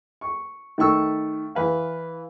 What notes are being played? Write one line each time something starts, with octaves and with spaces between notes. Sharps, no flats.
C#6
D#3 A3 C#6 E6
E3 B4 F5